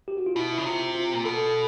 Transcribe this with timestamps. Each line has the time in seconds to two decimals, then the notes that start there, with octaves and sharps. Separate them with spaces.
0.08 G4
0.17 F#4
0.26 F4
0.36 B2 E4
0.51 E4
0.58 C#3
0.65 C3 F4
0.95 F4
1.14 A#2
1.25 B2 A4